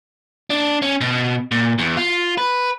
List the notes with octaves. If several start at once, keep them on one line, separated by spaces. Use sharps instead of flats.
D4
C#4
B2
A#2
E2
F4
B4